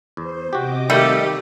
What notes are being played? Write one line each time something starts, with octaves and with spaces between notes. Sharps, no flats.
E2 C5
C3 F#4 G4 D#5 D6
D#3 G3 A3 A#3 G4